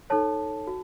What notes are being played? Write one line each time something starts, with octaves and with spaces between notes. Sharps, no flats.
D#4 A4 C#5 A5
F#4